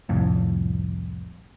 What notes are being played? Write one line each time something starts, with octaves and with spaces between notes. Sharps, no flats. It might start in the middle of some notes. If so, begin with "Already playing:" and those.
C2 F2 A2